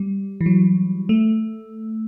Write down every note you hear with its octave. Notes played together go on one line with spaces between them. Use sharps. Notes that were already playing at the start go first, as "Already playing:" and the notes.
Already playing: G3
E3
F#3
A3